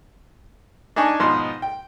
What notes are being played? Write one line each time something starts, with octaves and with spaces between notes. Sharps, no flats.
D4 D#4 G#5 A5 C#6
G#2 B2 F3 D#4 C6
G5